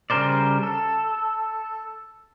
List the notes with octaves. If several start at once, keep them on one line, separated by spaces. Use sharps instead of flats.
C#3 G3 A#4 C5 D5
A4